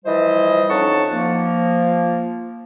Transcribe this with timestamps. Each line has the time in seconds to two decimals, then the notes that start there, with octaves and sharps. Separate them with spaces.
0.05 E3 F3 G3 C5 D#5
0.69 F2 C#4 D#4 F#5 A5 C#6
1.11 F3 A#3